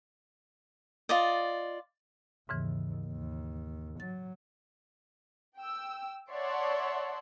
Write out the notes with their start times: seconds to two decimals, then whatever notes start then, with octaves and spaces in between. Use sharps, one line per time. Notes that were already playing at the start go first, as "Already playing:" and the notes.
1.09 F4 D5 D#5
2.49 D#2 G#2 C#3 E3
3.07 D#2
4.00 F#3 A6
5.58 G5 E6
6.31 C#5 D5 E5 F#5 A5 C6